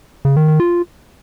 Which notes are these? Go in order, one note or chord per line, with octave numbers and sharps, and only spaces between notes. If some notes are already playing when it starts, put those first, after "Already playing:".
C#3
D#3
D#3
F4